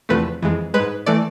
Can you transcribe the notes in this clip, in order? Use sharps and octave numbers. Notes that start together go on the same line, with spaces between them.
E2 C3 F3 A3 B4
F2 E3 G#3
G#3 B4
G#2
E3 A3 D5